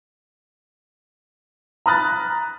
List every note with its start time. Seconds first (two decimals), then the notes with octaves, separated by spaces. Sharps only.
1.86 A#5 B5 D#6 F6 F#6 A6